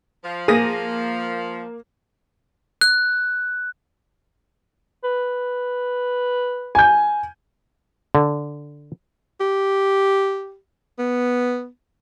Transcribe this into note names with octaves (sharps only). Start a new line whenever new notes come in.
F3
A#3 G#4 A#6 D#7
F#6
B4
G#5 G6
D3
G4
B3